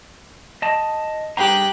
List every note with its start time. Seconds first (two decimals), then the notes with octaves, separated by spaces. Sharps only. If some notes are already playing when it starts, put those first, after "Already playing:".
0.62 D#5 A5
1.37 G2 G4 G#4 A#5 F#6